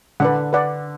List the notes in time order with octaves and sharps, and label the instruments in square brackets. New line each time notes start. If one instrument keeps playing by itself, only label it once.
[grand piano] D3 [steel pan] B4 D5 F#5
[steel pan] B4 D5 F#5